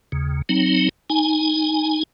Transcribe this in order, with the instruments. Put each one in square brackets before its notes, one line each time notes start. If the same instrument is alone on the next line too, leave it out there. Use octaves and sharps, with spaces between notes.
[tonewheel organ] D#2 C#3
F#3 C4 D#4
D#4 G#5